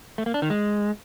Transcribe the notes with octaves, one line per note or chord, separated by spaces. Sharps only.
A3
A#3
D4
D#3
G#3